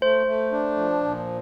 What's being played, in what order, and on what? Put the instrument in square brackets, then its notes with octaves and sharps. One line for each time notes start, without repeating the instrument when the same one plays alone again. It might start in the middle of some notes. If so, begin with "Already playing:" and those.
[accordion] A3 [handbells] C5
[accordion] A3
D4
F3
A#2